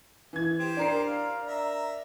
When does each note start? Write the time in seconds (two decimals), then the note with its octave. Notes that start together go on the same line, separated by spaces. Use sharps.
0.33 E3 G#6
0.59 G4 C5 G5
0.77 D4 A#4 C7
1.06 F5
1.47 E5 A#5